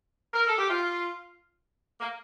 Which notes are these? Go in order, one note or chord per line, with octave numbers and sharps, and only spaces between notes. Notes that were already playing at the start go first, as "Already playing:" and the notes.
A#4
A4
G4
F4
A#3